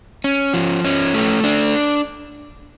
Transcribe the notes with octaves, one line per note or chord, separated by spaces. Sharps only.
C#4
F3
C#4
A3
D4